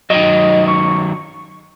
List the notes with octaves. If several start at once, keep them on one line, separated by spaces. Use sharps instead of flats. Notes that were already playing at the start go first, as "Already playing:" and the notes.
D#3 F#3 D#5
C#6